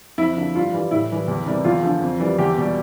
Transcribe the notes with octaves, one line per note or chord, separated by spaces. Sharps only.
F2 E4
D3 F3
G2 F4
E3 G3
A2 E4
E3 G3
E2
C3 E3 G3
E2 F4
D3 F3
F2
E3 G3
E2 G4
B2 G3